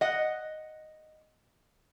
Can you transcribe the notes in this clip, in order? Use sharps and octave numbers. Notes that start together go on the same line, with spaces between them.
D#5 F#5